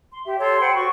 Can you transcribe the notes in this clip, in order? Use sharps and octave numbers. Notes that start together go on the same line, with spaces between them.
C6
G4 E5
A4 C#5 C6 G6
C5 F#5 G5 B5
F#4 C#6